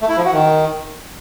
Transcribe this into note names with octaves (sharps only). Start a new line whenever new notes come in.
A3
E4
F3
F#4
D#3